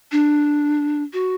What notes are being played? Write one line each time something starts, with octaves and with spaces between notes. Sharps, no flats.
D4
F#4